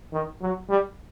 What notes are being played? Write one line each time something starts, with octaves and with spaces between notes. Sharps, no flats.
D#3
F#3
G3